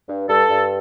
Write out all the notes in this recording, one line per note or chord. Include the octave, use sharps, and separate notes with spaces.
G2
G2 A4
G2